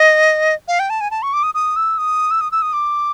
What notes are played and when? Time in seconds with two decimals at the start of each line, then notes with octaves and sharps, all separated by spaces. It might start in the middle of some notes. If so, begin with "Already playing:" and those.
Already playing: D#5
0.68 F5
0.80 G5
0.90 A5
1.01 G#5
1.11 A5
1.23 C#6
1.33 D6
1.43 D#6
1.55 D#6
1.76 E6
1.98 D#6
2.31 E6
2.41 D#6
2.52 E6
2.62 D#6
2.73 D6